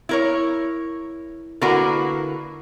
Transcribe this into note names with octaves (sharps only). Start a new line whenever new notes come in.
E4 A#4 C#5
D3 A#3 E4 F#4 A#4 B4